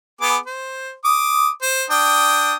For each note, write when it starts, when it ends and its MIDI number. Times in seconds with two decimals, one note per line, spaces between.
0.21 0.37 59
0.21 0.37 68
0.21 0.37 86
0.46 0.94 72
1.05 1.49 86
1.05 1.49 87
1.62 1.85 72
1.90 2.55 62
1.90 2.55 79
1.90 2.55 87